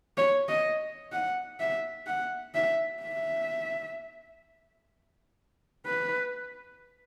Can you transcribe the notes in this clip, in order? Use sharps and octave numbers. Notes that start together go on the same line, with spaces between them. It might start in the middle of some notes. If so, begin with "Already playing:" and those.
C#5
D#5
F#5
E5
F#5
E5
E5
B4